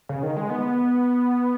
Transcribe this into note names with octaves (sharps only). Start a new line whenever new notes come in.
C#3
D#3
G#3
B3